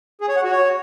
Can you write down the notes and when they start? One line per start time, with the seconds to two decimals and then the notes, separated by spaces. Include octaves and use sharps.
0.21 G#4
0.28 C#5
0.36 F#5
0.44 F#4
0.52 C#5